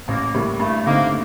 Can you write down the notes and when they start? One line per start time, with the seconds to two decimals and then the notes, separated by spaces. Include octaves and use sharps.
0.08 A1 A#3
0.34 A2 G3 A#3
0.59 G2 A3
0.86 D3 A3 A#3 C4 D#4